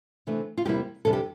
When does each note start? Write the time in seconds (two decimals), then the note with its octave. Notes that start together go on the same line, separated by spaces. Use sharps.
0.27 C3 E3 A3 D4
0.57 F4
0.65 E2 C3 G3 A#3 E4 G4
1.05 F2 C3 E3 G3 D4 A4
1.13 G4